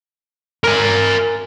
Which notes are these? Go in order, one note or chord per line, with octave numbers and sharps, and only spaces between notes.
A#4 G#5